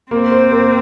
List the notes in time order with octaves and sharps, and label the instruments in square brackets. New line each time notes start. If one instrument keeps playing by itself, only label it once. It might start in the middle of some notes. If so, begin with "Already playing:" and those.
[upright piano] A#3 [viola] C4
[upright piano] C5
A#3